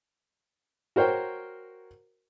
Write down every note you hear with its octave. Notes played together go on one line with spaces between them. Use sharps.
F#4 A#4 C5 C#5 G5